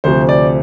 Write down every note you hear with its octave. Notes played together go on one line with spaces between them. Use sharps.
D2 C3 F3 C5
D5